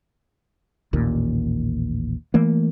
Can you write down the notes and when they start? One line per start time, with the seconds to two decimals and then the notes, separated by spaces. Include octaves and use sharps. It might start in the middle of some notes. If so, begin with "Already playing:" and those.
0.93 A1 D#2 A#2
2.34 E3 A3 A#3